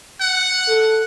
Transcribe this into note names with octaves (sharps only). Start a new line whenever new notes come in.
F#5
A4